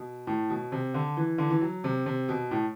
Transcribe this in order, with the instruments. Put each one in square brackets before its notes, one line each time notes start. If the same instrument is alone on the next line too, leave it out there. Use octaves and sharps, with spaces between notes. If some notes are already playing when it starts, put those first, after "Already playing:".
Already playing: [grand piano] B2
A2
B2
C3
D3
E3
D3
E3
F#3
C3
C3
B2
A2